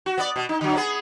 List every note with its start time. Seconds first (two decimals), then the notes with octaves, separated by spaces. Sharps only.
0.06 F#4
0.18 B3 D5
0.36 B2
0.49 D#4
0.61 D3 F#3
0.76 B3 G#4